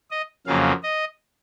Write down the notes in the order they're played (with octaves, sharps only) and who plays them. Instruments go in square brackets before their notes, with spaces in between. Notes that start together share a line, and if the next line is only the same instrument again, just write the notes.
[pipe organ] D#5
F2 C#3 F#3 A#3 F5
D#5